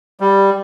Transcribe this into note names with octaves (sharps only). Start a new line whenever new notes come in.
G3